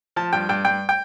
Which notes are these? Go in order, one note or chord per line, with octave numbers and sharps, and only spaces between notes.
F3 A5
G2 G5
G2 G5
G2 G5
G5